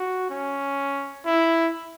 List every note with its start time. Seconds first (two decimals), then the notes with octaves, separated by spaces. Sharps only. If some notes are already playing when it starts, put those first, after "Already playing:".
Already playing: F#4
0.30 C#4
1.25 E4